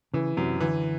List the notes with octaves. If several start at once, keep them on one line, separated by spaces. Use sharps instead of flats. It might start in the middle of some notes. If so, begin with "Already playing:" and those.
C#3 E3
F#2 C3
D3 E3